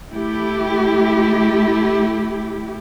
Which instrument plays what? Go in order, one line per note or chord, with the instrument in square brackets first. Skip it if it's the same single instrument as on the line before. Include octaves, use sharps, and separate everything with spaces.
[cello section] A3 E4 G4